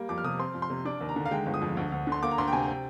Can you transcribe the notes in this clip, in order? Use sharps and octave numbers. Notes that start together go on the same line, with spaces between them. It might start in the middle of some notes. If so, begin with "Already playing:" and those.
Already playing: G3 A#3
F2 D6
F6
C3 D#6
C4 C6
F2
C6
C3
D4 D6
D#2
A#5
D3
F5
G#3 G5
G1
D#6
F2
D2
D2
D3
C6
A#3 D6
A#5
D2 C6
G5
C3 G#5
G5